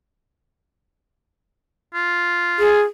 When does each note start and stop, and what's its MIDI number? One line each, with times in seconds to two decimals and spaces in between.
1.95 2.82 65
2.59 2.81 68